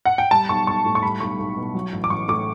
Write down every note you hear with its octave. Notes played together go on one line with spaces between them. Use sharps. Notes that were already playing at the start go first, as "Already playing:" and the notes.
F#5
G5
G3 A5
B1 C#6
B1 C#6
A2
C#6
G3 B5
B1 C#6
B1
B2
F#3
A1
D6
A1 C#6
A2 D6